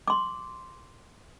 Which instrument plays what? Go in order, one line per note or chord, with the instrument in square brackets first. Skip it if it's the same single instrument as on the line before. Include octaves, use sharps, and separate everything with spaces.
[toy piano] C6 D6